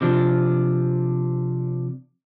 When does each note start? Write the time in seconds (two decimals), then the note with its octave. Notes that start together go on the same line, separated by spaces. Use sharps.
0.01 C3 F3 D4